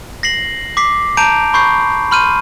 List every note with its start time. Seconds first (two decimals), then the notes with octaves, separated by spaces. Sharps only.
0.23 A#6 C7 F#7
0.77 D6 B6 C7
1.17 A5 A#5 G6 D7 F7
1.54 B5 C#6 G6 C7
2.11 B5 C6 F6 G6 D#7